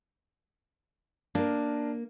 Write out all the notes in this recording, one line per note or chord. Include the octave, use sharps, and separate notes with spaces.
A#3 D4 A#4